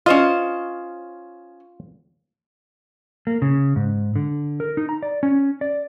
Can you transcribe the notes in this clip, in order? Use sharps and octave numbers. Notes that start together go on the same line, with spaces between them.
C#4 F4 C5 D#5
A#3
C#3
G#2
D3
A#4
D#4
A#5
D5
C#4
D5